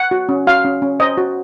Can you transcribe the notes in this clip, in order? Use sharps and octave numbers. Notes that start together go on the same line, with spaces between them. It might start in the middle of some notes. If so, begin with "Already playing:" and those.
Already playing: F#5
F#4
C#4
F#4 F5
C#4
C#4
C5 D#5
F#4